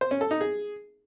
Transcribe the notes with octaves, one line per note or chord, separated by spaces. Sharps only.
C5
C#4
A4
D#4
G#4